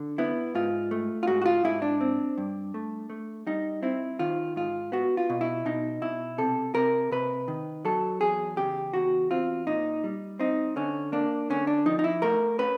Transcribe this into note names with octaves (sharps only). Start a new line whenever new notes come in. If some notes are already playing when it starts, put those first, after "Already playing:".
Already playing: D3
B3 E4
G#2 F4
A3
F4
G#2 F#4
F#4
F4
G#2 E4
D4
C4
G2
A3
A3
G3 D#4
C4 E4
D#3 F4
G#2 F4
B3 F#4
F4
B2
E4
B2 D#4
B2 E4
C3 A4
C3 A#4
C3 B4
D#3
F#3 A4
E2 G#4
C#3 G4
E2 F#4
C4 F4
A#2 D#4
G3
C4 D#4
D3 C#4
A#3 D4
D3 C#4
D4
F3 D#4
D#4
E4
A3 A#4
C#4 B4